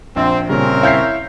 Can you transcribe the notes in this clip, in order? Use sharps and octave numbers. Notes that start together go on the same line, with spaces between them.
A#1 C4
A#2 C#3 G3 C4 C#4 A#4
E4 C#5 E5 F5 G6 C7